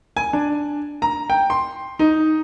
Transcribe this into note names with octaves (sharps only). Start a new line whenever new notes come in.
G#5
D4
A#5
G5
C6
D#4